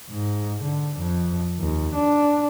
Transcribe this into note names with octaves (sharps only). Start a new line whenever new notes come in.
G#2
D3
F2
D#2
D4